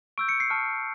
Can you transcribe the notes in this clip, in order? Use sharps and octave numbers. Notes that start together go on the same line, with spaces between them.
C#6 E6 G6 D7
C#7
C7
A5 C#6 F6